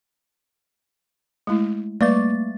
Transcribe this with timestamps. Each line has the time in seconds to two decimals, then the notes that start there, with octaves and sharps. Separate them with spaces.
1.47 G#3 A3 E4
2.01 G3 A3 A#3 B4 D5 A6